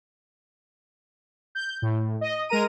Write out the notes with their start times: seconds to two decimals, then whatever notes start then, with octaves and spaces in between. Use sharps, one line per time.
1.55 G6
1.82 A2
2.21 D#5
2.48 G#3 A#4 A#5 D#7